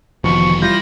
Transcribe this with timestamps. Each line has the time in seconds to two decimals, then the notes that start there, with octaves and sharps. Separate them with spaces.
0.24 F1 D#2 B2 E3 F3 C#6
0.62 E3 G3 F4 G6 A#6